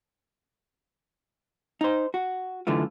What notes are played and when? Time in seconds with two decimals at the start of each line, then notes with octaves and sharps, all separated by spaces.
1.81 D#4 C5
2.14 F#4
2.67 F#2 D3 E3 A3 F4